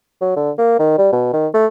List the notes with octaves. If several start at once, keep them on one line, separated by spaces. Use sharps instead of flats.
F#3
D3
A#3
D#3
G3
B2
D#3
A3